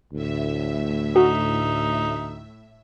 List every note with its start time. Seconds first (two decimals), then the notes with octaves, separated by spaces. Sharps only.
0.13 D2 A2 E5
1.16 D#4 F#4